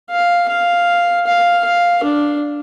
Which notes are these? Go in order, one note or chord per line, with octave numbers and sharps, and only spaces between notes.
F5
F5
F5
F5
D4